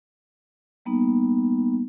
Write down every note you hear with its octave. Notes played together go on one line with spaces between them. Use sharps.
G3 A#3 B3 D#4